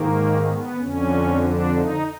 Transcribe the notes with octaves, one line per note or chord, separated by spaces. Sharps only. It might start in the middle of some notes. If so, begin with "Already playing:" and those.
Already playing: G#2 D#3 A#3
B3
F2 D3 C#4
D4
D#4